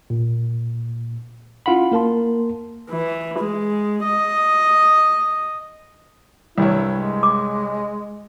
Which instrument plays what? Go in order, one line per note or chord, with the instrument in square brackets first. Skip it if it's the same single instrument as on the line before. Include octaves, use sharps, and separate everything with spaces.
[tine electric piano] A#2
C#4 E4 F4 F5 F#5 B5
A#3 A#4 A5 C6
[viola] E3
G#3
D#5
[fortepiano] C2 G2 C#5 [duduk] E4
[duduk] G#3
[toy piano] D6